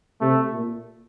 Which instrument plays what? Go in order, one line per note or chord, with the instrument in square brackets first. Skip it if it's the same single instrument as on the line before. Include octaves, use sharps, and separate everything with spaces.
[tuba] C3 [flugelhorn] A3
[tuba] A#2